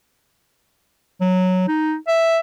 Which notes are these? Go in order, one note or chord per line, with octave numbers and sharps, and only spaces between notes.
F#3
D#4
E5